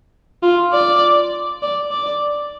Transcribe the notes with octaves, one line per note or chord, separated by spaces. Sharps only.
F4
D5
D5
D5